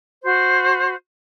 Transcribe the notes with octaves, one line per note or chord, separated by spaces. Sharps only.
F#4 C5